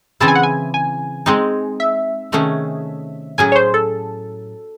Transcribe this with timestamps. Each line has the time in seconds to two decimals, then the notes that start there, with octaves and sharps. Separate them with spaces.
0.20 C#3 E3 C4 E4 G#4 A5
0.28 G#5
0.35 F#5
0.43 G#5
0.74 G#5
1.26 G#3 C4 D#4 G#4
1.80 E5
2.32 C3 D#3 A3 C#4 G#4
3.38 A2 F#3 C#4 G#4 G#5
3.52 C#5
3.56 C5
3.74 A4